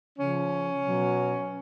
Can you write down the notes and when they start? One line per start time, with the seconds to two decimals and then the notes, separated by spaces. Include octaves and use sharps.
0.17 C#3 F3 C#4
0.81 B2 F#3